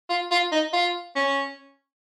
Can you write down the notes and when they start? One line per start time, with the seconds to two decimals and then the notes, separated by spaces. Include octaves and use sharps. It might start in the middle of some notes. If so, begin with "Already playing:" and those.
0.10 F4
0.31 F4
0.52 D#4
0.73 F4
1.16 C#4